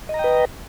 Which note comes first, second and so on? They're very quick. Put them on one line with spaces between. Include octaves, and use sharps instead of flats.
D#5 A#5 G5 B4